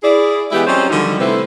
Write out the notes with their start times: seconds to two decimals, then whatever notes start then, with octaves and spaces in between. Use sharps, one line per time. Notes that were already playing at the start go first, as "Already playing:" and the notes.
0.03 E4 G#4 D5
0.52 E3 G#3 B3 E4 G4
0.67 F#3 C4 C#4 F4 C5 D#5
0.90 D3 D#3 F3 G3 D#4 F#4
1.19 C3 G3 A3 E4 B4 C5